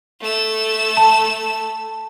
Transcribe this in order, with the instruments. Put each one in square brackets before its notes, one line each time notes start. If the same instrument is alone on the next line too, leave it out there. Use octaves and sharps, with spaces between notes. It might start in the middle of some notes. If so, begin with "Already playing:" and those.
[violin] A3 E6
[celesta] A5